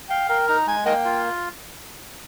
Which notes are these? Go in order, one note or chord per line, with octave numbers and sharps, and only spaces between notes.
F5 G5
A#4 G5
D#4 A#5
G#3 G#5
A#3 A#4 D#5 G5
F4